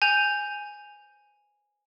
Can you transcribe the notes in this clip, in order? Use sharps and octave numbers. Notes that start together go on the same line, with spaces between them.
G#5 G6 F7